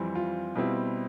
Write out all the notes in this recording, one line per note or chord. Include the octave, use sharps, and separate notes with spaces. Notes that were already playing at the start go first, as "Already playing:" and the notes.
Already playing: F2 E3 G3 C4
F4
B2 G3 C4 E4